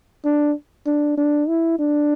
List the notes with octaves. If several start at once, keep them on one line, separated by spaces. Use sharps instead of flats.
D4
D4
D4
E4
D4